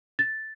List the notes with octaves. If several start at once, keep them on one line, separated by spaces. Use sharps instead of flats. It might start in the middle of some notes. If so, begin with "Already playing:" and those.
A6